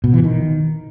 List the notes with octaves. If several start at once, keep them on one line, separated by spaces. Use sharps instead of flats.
B2
E3
D#3